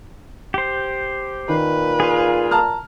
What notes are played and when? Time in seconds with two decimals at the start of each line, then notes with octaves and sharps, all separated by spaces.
0.54 G4 C5
1.49 A#2 D#3 B4
2.00 F4 G#4
2.51 A5 A#5 F6